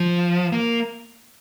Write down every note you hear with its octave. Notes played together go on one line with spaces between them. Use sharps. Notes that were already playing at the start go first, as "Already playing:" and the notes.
Already playing: F3
A#3